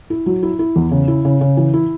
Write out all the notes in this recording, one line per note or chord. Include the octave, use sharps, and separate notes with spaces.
E4
F#3
E4
E4
E2
C#3
E4
C#3
C#3
E3
E4